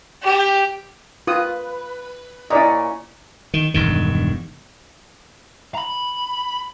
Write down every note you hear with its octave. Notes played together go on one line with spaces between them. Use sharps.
G4
F4 B4 D#6
A#2 C#4 E4 D5 D#5
D#3
E1 G2 D#3
A#5 B5